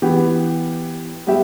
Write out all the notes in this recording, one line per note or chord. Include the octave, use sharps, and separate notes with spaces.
E3 B3 G4
G3 B3 G4 E5